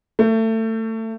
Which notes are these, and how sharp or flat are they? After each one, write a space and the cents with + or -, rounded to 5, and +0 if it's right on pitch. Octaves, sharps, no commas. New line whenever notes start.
A3 +25